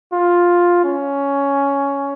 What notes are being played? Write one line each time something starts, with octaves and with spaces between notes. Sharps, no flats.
F4
C#4